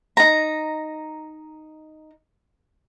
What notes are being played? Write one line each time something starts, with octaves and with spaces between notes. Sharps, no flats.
D#4 A#5